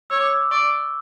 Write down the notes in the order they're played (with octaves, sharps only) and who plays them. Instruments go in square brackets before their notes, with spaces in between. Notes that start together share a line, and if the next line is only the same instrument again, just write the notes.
[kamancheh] C#5 [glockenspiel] E6
[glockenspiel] D6
E6
D6
[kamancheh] D5 [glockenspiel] C#6